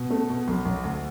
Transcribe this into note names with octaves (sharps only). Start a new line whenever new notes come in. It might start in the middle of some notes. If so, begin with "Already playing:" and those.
Already playing: B2
A3
B2
B1
B1
D2